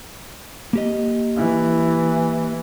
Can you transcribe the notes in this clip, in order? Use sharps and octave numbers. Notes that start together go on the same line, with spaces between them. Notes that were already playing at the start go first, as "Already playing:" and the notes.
A#3 G4 D#5
E3